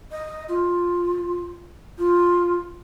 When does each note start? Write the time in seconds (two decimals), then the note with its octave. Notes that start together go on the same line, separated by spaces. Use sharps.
0.11 D#5
0.49 F4
1.98 F4